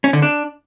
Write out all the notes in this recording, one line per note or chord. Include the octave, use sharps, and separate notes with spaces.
C#4
D3
D4